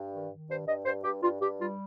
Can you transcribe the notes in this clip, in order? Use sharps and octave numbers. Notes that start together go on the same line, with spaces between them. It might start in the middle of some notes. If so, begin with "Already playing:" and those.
Already playing: G2
D#3
D#3
G2 C5
G2 D#5
G2 C5
G2 G4
G2 F4
G2 G4
G3 F4